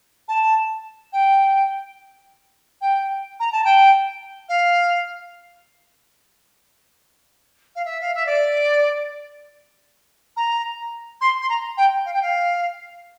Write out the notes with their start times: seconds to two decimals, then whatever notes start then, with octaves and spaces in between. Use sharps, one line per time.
0.28 A5
1.12 G5
2.81 G5
3.39 A#5
3.52 A5
3.64 G5
4.48 F5
7.75 F5
7.85 E5
8.01 F5
8.14 E5
8.26 D5
10.36 A#5
11.20 C6
11.41 C6
11.49 A#5
11.77 G5
12.05 F5
12.13 G5
12.21 F5